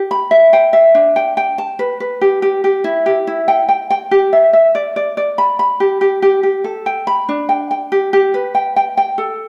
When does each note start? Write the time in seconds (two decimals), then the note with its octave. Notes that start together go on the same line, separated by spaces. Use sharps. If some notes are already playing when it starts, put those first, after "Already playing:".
Already playing: G4
0.11 B5
0.31 E5
0.53 G5
0.73 E5
0.95 D4
1.16 G5
1.37 G5
1.58 A5
1.79 B4
2.00 B4
2.21 G4
2.42 G4
2.64 G4
2.84 E4
3.06 G4
3.27 E4
3.48 G5
3.69 G5
3.90 G5
4.11 G4
4.33 E5
4.53 E5
4.75 D5
4.96 D5
5.17 D5
5.38 B5
5.59 B5
5.80 G4
6.01 G4
6.22 G4
6.43 G4
6.64 A4
6.86 G5
7.07 B5
7.29 D4
7.49 G5
7.71 G5
7.92 G4
8.13 G4
8.34 B4
8.55 G5
8.76 G5
8.97 G5
9.18 A4